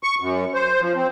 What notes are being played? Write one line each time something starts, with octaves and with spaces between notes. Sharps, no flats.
C#6
F#2
C5
F3
C4